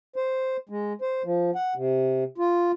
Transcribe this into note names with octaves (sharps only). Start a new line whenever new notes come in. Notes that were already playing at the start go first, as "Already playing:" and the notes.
C5
G#3
C5
F3
F#5
C3
F4